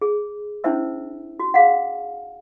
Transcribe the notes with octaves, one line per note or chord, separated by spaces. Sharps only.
G#4
C#4 D4 E4 C5 E5 E6
F#4
G#4 F5 F#5